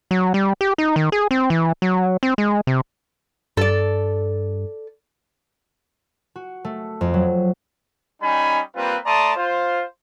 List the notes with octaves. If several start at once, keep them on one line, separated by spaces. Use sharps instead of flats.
F#3
G3
G4
D#4
D#3
G#4
C4
E3
F#3
C4
G#3
C3
G2 A4 D5
F#4
A3
F2
F#3
G3 C#4 D#4 G#5 B5
G3 A#3 C4 F4 B4
A3 D5 A5 A#5 C6 D#6
F4 C5